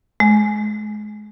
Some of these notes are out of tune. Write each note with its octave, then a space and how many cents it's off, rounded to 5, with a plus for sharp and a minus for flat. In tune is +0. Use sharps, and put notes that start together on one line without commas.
G#3 +30